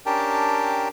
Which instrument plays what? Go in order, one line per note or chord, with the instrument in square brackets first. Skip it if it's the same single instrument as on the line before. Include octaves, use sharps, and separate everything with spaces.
[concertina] C#4 D4 G4 A#4 G5 A5